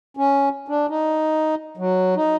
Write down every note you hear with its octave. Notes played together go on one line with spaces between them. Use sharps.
C#4
D4
D#4
F#3
D#4